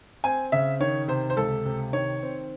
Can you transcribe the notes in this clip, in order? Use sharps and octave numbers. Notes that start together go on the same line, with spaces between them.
C4 G#5
C#3 E5
D#3 C#5
C3 C5
C5
C#2 A4
C3
D#3 C#5
C4